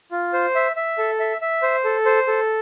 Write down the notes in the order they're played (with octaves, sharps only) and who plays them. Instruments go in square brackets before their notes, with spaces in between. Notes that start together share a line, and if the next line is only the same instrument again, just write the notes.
[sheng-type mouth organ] F4
C5
E5
E5
A4
E5
E5
C5
A4
C5
A4